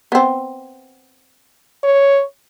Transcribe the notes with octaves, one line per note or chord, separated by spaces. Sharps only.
B3 C4
C#5